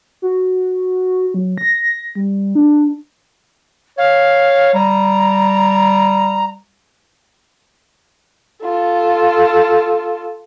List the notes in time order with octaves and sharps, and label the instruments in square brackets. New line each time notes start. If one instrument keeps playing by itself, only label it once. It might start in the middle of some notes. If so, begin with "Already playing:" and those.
[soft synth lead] F#4
F#3
A#6
G3
D4
[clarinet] C#5 [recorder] F5
[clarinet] G3 [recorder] A#5
[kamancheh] F4 A4